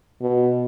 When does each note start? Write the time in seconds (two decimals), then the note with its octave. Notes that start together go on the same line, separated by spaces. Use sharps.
0.22 B2